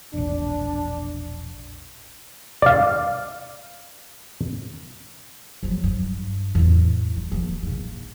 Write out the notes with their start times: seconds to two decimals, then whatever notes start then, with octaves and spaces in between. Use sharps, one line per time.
0.13 E1 A#1 D4
2.62 D5 F5
5.63 F3 F#3
5.84 G2
6.55 E2 A2
7.16 G3
7.31 F3 A#3
7.63 A#1 A#3